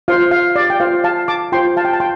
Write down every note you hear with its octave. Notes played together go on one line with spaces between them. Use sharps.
F4 C5 F5
F5
D5
G5
F4 C5 F5
F5 A5
A5 D6
F4 C5 G5 C6
F5 A5
G5
A5
G5 C6